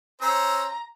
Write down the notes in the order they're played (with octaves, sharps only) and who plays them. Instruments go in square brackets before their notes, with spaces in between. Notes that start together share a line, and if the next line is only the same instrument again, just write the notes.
[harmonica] C#4 C5 E6 [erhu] A#5